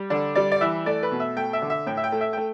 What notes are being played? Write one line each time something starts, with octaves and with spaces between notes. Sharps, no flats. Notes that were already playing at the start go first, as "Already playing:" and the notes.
Already playing: G3
D3 D4
G3 D5
D5
E3 E5
A3 D5
B4
B2
E5
A3 G5
E5
D3
E5
A2 G5
E5
G5
A3
E5
A3 G5